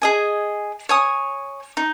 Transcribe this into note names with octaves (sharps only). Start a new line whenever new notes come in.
G#4 D#5 G#5
C#5 G#5 D#6
D#4